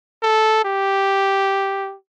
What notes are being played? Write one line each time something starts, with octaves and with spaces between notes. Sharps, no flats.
A4
G4